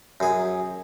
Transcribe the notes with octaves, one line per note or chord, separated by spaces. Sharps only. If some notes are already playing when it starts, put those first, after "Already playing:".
F#2 G#4